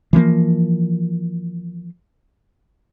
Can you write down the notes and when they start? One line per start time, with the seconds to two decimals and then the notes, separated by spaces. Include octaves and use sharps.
0.13 E3 F3 A3 A#3